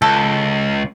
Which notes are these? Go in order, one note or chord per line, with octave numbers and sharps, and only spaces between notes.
C#2 A4